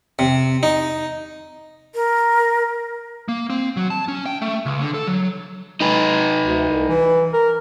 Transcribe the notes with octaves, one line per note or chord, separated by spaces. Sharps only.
C3
D#4
A#4
A#3
C4
F#3
A5
C#4
G5
A3
C#2
D3
A4
F#3
G#3 D#4 B4
D2
C2
E3
A#4